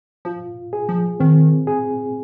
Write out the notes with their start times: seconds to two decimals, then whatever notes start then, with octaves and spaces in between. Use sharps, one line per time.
0.25 F3 F4
0.73 G#4
0.89 F3
1.20 D#3 C4
1.67 G#4